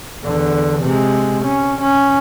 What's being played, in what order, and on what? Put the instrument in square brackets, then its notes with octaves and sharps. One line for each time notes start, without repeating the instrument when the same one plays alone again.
[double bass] E2 D3
C3 G#3
C#4
C#4